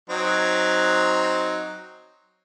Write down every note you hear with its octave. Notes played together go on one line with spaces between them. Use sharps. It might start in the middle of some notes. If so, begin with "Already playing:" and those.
F#3 C4 D#4